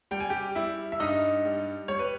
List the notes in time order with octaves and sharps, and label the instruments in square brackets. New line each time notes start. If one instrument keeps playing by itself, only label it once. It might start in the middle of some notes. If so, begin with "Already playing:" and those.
[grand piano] G3 [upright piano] G5
[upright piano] G#5
G4 G5
[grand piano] G3 [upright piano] E4 E5
[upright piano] E5
[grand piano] G2 [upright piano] D#4 D#5
[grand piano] G3
[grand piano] G3 [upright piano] C#5
[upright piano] B4